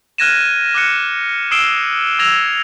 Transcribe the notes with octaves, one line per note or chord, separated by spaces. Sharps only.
F6 F#6 G#6 A#6 D#7 E7
D6 F6 F#6 C#7
D#6 E6 C7 D7 E7 G7
E6 G#6 A#6 F7